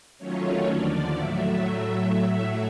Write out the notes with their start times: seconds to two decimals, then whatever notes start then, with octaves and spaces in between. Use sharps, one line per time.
0.18 D#3 F#3 A3 C#4 F4 C#5
0.65 D#2 D3 F3 D5
1.14 A2 F#3 A3 E5